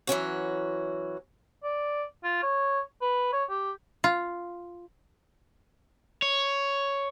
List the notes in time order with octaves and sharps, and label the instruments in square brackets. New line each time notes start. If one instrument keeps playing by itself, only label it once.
[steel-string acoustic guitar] E3 F#3 C#4 F#4
[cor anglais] D5
F4
C#5
B4
C#5
G4
[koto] F4
[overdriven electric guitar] C#5